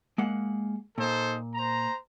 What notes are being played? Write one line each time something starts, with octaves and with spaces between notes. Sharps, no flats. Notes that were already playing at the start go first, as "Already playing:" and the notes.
G#3 A#3 F#5
A#2 D#4 A4 C5
C5 A#5